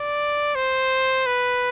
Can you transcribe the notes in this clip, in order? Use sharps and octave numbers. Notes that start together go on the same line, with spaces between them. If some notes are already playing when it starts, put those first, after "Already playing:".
Already playing: D5
C5
B4